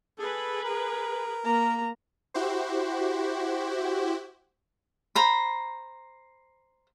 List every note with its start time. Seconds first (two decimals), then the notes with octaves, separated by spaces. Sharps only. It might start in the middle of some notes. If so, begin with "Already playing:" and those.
0.19 G#4 A4 B4
0.63 A#4
1.45 A#3 A#5
2.34 E4 F#4 G4 C5
5.15 C5 A#5 B5